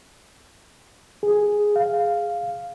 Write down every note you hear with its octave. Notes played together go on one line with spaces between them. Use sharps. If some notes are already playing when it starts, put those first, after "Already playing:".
G#4
F5